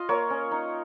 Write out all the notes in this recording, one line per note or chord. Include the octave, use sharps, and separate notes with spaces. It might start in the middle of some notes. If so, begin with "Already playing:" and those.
Already playing: F4 D#5 F5
A#3 C#5
C#4
D#4